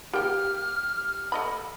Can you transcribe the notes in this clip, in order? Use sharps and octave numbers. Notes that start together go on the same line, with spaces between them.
A#3 G4 G5 F6
A3 D#5 B5